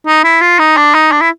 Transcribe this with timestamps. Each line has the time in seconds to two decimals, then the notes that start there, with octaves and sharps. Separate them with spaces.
0.07 D#4
0.24 E4
0.41 F4
0.59 D#4
0.77 D4
0.95 D#4
1.12 D4
1.21 E4